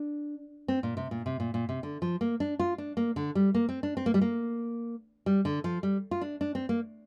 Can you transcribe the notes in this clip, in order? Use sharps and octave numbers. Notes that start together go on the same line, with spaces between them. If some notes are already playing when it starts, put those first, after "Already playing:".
Already playing: D4
C4
A#2
C3
A#2
C3
A#2
A#2
C3
D3
F3
A#3
D4
F4
D4
A#3
D3
G3
A#3
C4
D4
C4
A#3
G3
A#3
G3
D3
F3
G3
F4
D4
D4
C4
A#3